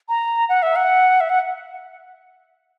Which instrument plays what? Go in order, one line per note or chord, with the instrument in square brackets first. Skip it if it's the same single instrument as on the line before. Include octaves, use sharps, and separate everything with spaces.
[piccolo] A#5
F#5
E5
F#5
E5
F#5